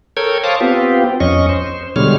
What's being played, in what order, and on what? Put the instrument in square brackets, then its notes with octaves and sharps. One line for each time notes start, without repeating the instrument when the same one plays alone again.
[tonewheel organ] A4 A#4 C#5 G5 G#6
C5 C#5 F5 A5 D6 D#6
B3 C4 F4 G4
F2 C#4 D#5 C#6
C5
B2 D3 G3 G#3 C#5 F6